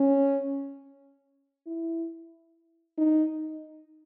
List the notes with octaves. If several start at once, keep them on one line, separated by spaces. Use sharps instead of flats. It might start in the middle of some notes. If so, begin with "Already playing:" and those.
Already playing: C#4
E4
D#4